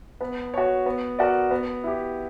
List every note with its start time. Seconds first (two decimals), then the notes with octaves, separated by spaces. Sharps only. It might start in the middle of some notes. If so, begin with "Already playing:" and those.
0.21 B3
0.54 F#4 C#5
0.86 B3
1.19 F#4 A#4 D5
1.51 B3
1.84 E4 G4